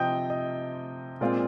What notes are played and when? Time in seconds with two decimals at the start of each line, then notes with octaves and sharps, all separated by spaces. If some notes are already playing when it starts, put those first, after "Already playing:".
Already playing: C3 F3 C4 D#5 G5 D#6 G6
0.30 D#5
1.21 A#2 G#3 C4 F4 D5